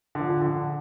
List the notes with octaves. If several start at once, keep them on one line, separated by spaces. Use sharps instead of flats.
D3 F3
D3